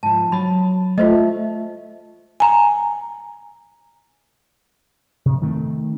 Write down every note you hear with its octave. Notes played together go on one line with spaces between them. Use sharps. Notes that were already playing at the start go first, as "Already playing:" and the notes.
G#2 F3 A5
F#3 A5 B5
A3 F4 C5 D#5
G#5 A#5
C3
D#3 A3 C4